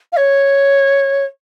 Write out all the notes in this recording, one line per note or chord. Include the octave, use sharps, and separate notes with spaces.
F5
C#5